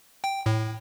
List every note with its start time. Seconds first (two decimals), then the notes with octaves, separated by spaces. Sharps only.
0.24 G5
0.46 A2